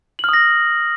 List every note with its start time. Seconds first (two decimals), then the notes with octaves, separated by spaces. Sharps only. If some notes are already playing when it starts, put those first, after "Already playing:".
0.19 F#7
0.24 F6
0.29 D#6
0.33 A#6